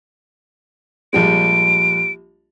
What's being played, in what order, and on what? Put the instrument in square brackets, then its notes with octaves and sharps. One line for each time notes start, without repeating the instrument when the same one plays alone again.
[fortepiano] A#1 G3 G#3 [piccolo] D7